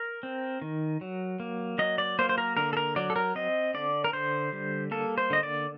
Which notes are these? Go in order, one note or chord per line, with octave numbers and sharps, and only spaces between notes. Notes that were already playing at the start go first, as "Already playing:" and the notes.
Already playing: A#4
C4
D#3
F#3
A#3
F#3 D#5
D5
A#3 C5
C5
A#4
D3 A#4
A4
A#4
F#3 D5
A4
A#4
C4 D#5
D3 D5
A#4
D3 C5
G3
A#3 A4
C5
D3 D#5
D5